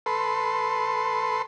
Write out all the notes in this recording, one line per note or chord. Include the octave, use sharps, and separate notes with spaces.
A4 B4 C6